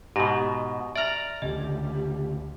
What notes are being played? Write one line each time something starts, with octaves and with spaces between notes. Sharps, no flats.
G#2 B2 G4 A#6
D5 E5 A#5 F6 F#7
D2 C#3 G4 D#5